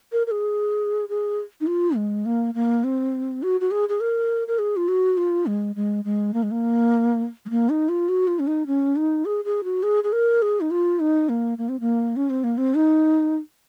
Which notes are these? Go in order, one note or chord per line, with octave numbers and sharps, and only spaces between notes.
A#4
A#4
G#4
G#4
D#4
F4
G#3
A#3
A#3
C4
F#4
F#4
G#4
G#4
A#4
A#4
G#4
F4
F#4
F4
G#3
G#3
G#3
A#3
G#3
A#3
G#3
A#3
D#4
F4
F#4
F4
C#4
D#4
C#4
D#4
G#4
G#4
F#4
G#4
G#4
A#4
G#4
D#4
F4
D#4
A#3
A#3
C4
A#3
C#4
C4
A#3
C4
D#4